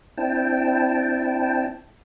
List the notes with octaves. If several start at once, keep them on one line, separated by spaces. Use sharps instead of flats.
C4 D4 E4 G5 A5